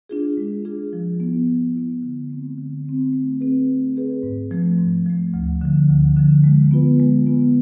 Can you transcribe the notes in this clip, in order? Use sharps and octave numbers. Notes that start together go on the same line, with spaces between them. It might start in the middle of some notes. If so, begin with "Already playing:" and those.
D4 F4 G#4
G#3
D4 F4 G#4
F3
B3 E4
F3
B3 E4
D3
A3 C4
D3
A3 C4
A3
C4 G#4 B4
A3
C4 G#4 B4
G#2
F3 A3
G#2
F3 A3
D2
D3 F3
D2
D3 F3
G#3
B3 F4 B4
G#3
B3 F4 B4